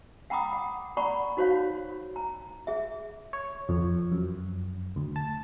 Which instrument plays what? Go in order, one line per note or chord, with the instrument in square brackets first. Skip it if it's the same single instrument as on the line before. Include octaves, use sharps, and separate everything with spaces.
[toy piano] F#5 G5 A#5 B5 D6 D#6
F#5
D5 F#5 A#5 B5 C#6
D#4 F#4 C5 C#5 F5
A#5
G#4 E5
[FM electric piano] C#5
F2
F#2
D2
A5